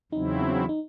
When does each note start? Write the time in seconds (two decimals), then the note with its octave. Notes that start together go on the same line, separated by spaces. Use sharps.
0.12 E2 C#3 F#3 C4 D#4 E4
0.69 D#4